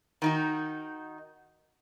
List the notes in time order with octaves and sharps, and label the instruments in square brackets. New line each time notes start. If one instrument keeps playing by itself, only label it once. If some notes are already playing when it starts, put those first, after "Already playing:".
[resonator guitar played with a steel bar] D#3 D#4 F#4